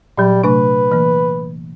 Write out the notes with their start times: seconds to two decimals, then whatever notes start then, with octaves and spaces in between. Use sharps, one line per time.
0.18 A#2 F#3 G3
0.44 C3 A3 D4 B4
0.92 E3 A#3